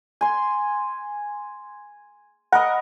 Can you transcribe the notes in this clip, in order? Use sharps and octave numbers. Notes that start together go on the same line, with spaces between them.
G#5 C6
A#4 B4 D#5 F#5